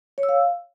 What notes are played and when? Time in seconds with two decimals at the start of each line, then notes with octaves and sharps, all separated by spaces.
0.18 C#5
0.23 E6
0.29 F5